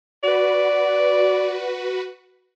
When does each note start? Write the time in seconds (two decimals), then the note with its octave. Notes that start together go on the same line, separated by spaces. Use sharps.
0.23 F#4 B4 D5